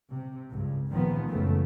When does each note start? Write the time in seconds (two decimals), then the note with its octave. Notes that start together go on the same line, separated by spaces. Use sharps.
0.11 C3
0.51 C#2 G2
0.90 G#1 C#2 A#2 D#3 F3 B3
1.29 A#1 F#2 C#3 E3 A3